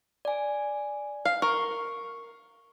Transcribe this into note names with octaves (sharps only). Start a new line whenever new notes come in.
D5 G#5
F5
A#4 C#6